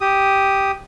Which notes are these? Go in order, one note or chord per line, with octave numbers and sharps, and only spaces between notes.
G4 D#6